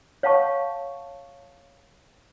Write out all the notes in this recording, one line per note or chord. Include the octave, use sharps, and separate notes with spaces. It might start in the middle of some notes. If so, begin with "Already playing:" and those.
C#5 F5 F#5 A5 C#6